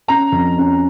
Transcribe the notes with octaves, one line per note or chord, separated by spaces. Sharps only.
C#4 A#5
F2
C#4